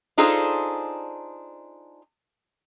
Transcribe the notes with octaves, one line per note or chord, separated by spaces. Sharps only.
D4 D#4 F4 G#4 A4 C5